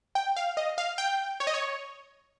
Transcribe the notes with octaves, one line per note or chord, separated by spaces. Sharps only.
G5
F5
D#5
F5
G5
C#5
D#5
C#5